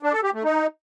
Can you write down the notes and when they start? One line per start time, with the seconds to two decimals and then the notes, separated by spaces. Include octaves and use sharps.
0.03 D4
0.13 A4
0.23 G4
0.34 A3
0.44 D#4